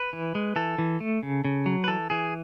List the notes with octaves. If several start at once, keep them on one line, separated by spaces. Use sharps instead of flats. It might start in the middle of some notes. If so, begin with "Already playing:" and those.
Already playing: B4
E3
G#3
E3 A4
E3
A3
C#3
C#3
F#3
B4
E3 A4
E3 G#4